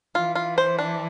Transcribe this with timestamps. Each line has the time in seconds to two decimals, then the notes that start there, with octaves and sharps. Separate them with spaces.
0.15 E3 F4
0.35 F4
0.58 C5
0.79 D4